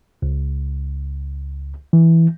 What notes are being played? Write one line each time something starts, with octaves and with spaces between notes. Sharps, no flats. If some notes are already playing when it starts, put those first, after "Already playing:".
C#2
E3